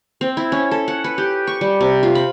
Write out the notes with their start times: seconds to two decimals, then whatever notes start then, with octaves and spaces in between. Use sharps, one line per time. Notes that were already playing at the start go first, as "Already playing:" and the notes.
0.21 C4
0.37 E4
0.52 C#4
0.71 A4
0.88 F#5
1.04 B4
1.18 G4
1.47 C#6
1.61 G3
1.81 C3
2.03 F4
2.15 B5